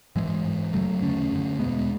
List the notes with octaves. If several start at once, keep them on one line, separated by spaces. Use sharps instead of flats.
G#2 E3 G#3
G#2
F#2 C#3 F#3 A3
E2 D3 A3 C#4
F#2 D3
E2 B2 G#3 B3